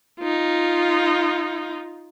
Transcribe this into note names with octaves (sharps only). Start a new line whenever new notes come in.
D#4 F4